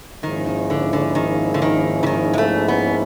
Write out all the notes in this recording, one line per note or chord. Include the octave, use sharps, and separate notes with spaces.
G#2 D#3 F3 A#3 C#4 E4
D#3
D3
D3
D#3
D3
D#3
E3
D#3
G#3
A3
B3